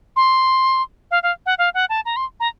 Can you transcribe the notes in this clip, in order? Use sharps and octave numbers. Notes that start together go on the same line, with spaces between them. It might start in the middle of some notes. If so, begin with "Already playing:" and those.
C6
F5
F5
F#5
F5
F#5
A5
A#5
C6
A#5